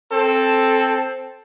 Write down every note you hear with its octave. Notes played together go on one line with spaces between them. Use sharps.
C4 A4